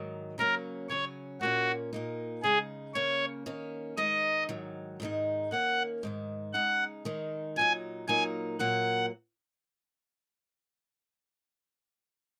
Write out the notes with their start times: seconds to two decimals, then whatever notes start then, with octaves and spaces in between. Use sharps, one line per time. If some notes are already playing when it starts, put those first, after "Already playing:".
Already playing: G#2 D#3 F#3
0.38 C#3 F#3 A#3 C#4 A#4
0.89 C#3 F#3 C#4 C#5
1.41 A#2 A#3 C#4 F#4
1.93 A#2 A#3 D#4
2.43 C#3 G#3 D#4 G#4
2.94 C#3 A#3 C#4 C#5
3.46 D#3 A#3 C#4
3.97 D#3 G#3 D#4 D#5
4.49 G#2 D#3 F#3
5.00 G#2 D#3 G#3 D#4
5.51 D#3 A#3 C#4 F#5
6.03 G#2 D#3 G#3
6.53 C#3 G#3 D#4 F#5
7.05 D#3 G#3 D#4
7.56 A#2 F#3 D#4 G#5
8.08 A#2 F#3 A#3 D#4 G#5
8.59 A#2 F#3 A#3 F#5